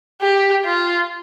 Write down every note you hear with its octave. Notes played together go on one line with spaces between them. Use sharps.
G4
F4